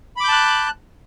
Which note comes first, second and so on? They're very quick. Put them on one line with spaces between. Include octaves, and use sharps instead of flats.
B5 D6 G6 A5 F#6